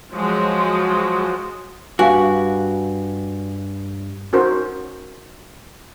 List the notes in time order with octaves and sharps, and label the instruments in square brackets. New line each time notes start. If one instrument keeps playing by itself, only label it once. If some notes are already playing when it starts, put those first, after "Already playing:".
[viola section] F3 F#3 G#3 F#4
[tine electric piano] G2 [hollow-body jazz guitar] F#4 [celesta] F5 G#5
[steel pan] C#4 D#4 F#4 A#4 C5